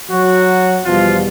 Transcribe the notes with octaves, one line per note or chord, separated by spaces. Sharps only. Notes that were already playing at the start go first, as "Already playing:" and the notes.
F#3 F#4
E2 B2 F3 G3 F4